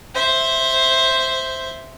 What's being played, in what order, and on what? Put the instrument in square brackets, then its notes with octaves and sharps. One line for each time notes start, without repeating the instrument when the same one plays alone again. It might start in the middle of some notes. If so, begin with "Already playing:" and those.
[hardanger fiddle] C5 E5